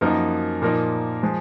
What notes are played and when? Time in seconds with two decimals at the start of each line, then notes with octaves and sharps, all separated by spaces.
0.01 F#2 F3 A#3 D#4 A#4
0.62 A#2 F3 A#3 D#4 A#4
1.23 F3 G#3